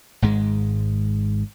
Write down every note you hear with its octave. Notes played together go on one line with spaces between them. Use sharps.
G#1 G#2 G#3